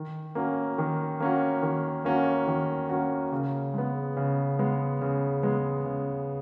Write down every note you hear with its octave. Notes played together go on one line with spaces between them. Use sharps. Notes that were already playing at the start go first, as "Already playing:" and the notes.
Already playing: D#3
A#3 C#4 F#4
D#3
A#3 C#4 F#4
D#3
A#3 C#4 F#4
D#3
A#3 C#4 F#4
C#3
G#3 B3
C#3
G#3 B3
C#3
G#3 B3
C#3